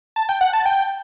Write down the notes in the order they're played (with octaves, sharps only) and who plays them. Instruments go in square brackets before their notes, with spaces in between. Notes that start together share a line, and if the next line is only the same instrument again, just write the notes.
[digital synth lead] A5
G5
F#5
A5
G5